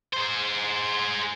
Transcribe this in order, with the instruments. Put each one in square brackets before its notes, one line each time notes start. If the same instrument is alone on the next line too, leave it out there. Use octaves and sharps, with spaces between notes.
[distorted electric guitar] G#4 C5